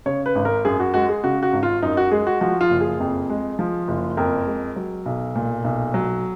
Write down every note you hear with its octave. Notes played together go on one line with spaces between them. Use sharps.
C#3 C#5
B4
G#1
A#4
F#2 G#4
F#4
G#3 F#4
G#4
C#3 F#4
F#4
G#1
F4
F#2 D#4
F#4
G#3 G#4
F#4
F3 F#4
F4
F#1
G#4
F2
G#3
F3
F#1
F2 A#4
G#3
F#3
B1
A#2
B1
F#3